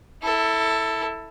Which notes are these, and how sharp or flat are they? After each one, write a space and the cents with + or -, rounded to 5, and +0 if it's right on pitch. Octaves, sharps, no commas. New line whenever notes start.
E4 -10 A4 +15